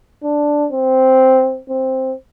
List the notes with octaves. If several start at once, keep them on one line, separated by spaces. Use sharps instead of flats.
D4
C4
C4